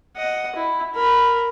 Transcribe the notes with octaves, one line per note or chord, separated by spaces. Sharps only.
D#5 F#5
E4
A#4 B5